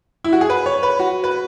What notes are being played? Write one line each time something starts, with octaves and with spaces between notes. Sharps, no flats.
E4
F#4
G#4
B4
C#5
B4
F#4
B4